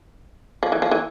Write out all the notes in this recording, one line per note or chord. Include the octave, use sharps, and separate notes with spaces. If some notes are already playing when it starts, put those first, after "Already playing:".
F3
E3
F3
E3